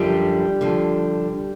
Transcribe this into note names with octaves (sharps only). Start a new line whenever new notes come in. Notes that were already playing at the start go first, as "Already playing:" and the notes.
Already playing: F#2 D3 F3 G3 G4
D3 F3